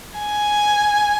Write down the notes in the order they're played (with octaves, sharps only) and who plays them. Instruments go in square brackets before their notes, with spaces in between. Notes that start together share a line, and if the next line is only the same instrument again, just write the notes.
[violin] G#5